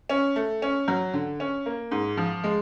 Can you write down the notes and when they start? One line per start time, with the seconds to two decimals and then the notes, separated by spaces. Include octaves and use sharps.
0.09 C#4
0.36 A3
0.62 C#4
0.88 F#3
1.13 D3
1.40 C#4
1.66 A#3
1.91 G#2
2.17 F3
2.44 G#3